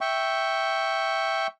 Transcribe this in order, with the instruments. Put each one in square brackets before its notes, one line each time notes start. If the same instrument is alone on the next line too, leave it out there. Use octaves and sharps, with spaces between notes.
[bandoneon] E5 G5 C#6